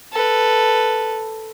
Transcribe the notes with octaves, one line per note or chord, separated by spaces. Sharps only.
A4 B4